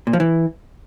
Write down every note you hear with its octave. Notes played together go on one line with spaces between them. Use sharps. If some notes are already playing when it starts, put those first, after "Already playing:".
A#2
F3
E3